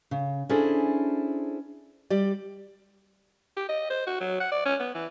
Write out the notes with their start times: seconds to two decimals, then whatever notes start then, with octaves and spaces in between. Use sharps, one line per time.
0.11 C#3
0.49 C#4 D4 E4 G#4 A4 C5
2.10 G3 G4 D5
3.57 G4
3.69 D#5
3.90 C5
4.07 F#4
4.21 F#3
4.40 F#5
4.52 D5
4.65 C#4
4.80 B3
4.94 E3